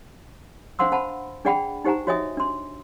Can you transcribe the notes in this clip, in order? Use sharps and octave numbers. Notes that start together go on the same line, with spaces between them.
D4 C5 F5 F#5 C6 E6
C5 F#5 A5 B5
D4 G#4 D5 F#5 G5 B5
D#4 G4 C5 F#5 G#5 A#5
F#4 C#5 D#5 E5 G#5 D#6
D4 C6